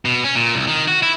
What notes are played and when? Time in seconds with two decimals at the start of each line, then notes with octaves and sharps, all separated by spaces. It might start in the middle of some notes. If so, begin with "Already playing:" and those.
0.05 B2
0.24 C#4
0.35 A#2
0.55 C2
0.68 D#3
0.88 F#4
1.03 E4